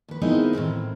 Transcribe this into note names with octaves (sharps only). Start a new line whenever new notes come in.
D#2 B4
B3 C4 D#4 E4 G#4 A#4
A2 D#3 E3 C4